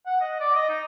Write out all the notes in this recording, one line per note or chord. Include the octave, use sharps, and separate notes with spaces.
F#5
D#5
D5
D#5
D#4